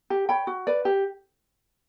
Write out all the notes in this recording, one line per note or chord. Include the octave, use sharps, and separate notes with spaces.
G4
C#5 G5 B5
F#4
B4 D5
G4